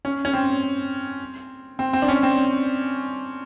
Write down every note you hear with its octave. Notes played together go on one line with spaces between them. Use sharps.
C#4
C#4
C4
C4
C4
D4
C#4
C4